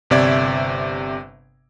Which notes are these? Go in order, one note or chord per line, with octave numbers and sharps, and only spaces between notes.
G1 C3 D5 E5 G#6